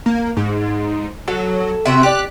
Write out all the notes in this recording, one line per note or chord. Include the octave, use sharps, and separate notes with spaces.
A#3
G#2
F#3 A4
C3 C4 F#4 E5
G4 D5 F#6